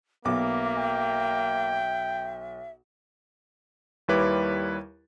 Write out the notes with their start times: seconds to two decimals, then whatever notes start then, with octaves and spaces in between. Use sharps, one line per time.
0.25 B1 A#3 B3 E5 D6
0.78 G5
4.08 D#2 G3 E4 B4 C#5 D6